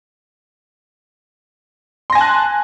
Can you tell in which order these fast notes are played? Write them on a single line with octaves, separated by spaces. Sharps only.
C6 A#6 G#5 A5 F#6